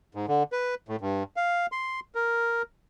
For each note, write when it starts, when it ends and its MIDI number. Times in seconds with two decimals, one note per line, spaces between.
0.15 0.26 44
0.28 0.43 50
0.52 0.75 71
0.89 0.96 45
1.01 1.23 43
1.36 1.66 77
1.72 2.00 84
2.15 2.62 70